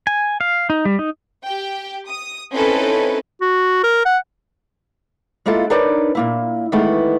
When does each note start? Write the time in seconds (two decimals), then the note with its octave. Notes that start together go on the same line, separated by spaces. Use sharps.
0.07 G#5
0.41 F5
0.70 D#4
0.85 G3
0.99 D#4
1.45 G4 G5
2.08 D#6
2.52 C4 C#4 D#4 E4 A4 B4
3.41 F#4
3.84 A#4
4.05 F#5
5.46 G#3 A#3 E4 F4 A4
5.70 D4 D#4 A#4 B4 C#5 D5
6.15 A#2 A#3 E4
6.72 D#3 E3 G#3 A3 B3 E4